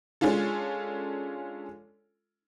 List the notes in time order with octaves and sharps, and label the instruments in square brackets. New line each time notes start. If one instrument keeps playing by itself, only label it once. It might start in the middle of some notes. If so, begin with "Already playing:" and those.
[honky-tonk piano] G#3 C#4 D4 F4 A4